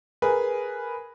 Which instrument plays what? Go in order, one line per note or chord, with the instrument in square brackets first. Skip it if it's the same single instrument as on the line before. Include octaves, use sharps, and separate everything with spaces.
[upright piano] G#4 A#4 B4 G#5